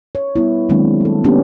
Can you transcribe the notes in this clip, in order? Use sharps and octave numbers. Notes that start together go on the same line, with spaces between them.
C#5
G3 B3 E4
D#3 F#3 G#3 A#3 C4 D4
G3 A4
A#3 B3 C#4 D4 F#4 G4